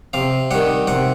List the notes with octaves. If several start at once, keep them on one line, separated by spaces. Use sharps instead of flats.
C3 F5
D#3 G3 F#5
C3 F#5